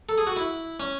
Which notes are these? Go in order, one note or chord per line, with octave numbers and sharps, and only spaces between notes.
A4
G#4
F#4
E4
C#4